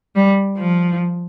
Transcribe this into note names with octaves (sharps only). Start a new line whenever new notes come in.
G3
F3